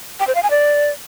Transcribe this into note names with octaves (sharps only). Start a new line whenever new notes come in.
G5
C5
F5
G#5
D5